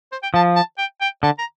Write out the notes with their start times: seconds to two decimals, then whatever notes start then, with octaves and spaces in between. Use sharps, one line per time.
0.12 C5
0.23 G5
0.34 F3 A5
0.56 A5
0.78 G5
1.01 G5
1.23 D3 A5
1.38 A#5